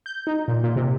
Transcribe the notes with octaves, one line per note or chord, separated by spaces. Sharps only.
G6
D#4
A#2
A#2
C3